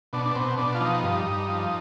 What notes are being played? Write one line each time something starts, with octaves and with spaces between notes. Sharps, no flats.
B2 D4
D4
B2 C4
B2 D4
F4
F3 D#4
G2
G2
F3